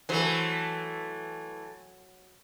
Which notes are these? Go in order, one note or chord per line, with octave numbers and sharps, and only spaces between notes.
E3 F#3 A3 C5